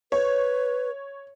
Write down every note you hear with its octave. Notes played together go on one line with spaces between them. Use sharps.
B4 C#5